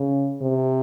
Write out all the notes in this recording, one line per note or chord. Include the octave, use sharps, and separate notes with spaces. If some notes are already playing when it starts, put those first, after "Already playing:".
Already playing: C#3
C3